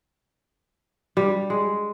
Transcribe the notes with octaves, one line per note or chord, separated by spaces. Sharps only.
G3
G#3